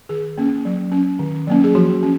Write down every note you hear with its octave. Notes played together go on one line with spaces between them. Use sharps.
D#3 G#4
A#3 C#4
F#3
C#4
D#3
F#3 A#3 C#4
G#4
F3 F#4
C#4